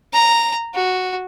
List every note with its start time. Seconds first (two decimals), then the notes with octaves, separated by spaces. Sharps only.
0.13 A#5
0.75 F#4